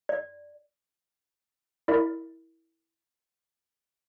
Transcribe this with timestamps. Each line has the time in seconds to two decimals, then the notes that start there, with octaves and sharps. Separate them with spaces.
0.09 D5
1.88 E4 A#4 D5 E5